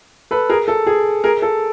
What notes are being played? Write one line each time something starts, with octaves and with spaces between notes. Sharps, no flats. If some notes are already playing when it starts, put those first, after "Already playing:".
A4 B4
G#4 A#4
A4
G#4
G#4 A#4
A4